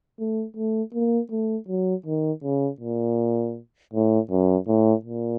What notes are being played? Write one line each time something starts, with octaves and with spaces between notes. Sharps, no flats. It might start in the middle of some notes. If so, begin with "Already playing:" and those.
A3
A3
A#3
A3
F#3
D#3
C#3
A#2
A2
F#2
A2
A#2